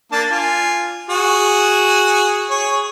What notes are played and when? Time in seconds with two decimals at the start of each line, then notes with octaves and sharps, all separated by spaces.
0.12 A#3 D4 A5
0.31 F4 G#5
1.09 F#4 G#4
2.50 G#4 C#5